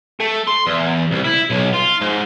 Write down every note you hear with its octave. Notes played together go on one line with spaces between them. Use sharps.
A3
C6
E2
C2
E4
B1
F4
G#2